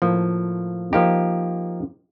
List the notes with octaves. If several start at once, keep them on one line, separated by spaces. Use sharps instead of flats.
A2 F3 A#3
F3 A#3 D#4 G4